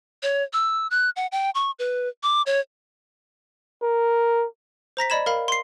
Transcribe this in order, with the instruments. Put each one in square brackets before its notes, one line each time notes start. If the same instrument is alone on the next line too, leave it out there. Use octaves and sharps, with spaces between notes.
[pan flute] C#5
E6
F#6
F#5
G5
C#6
B4
D6
C#5
[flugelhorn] A#4
[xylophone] C5 A#5 A#6 B6
D5 D#5 B5 G#6 E7
A#4 F5 B5
C6 C7